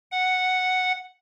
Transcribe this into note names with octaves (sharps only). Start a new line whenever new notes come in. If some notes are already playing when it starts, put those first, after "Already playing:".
F#5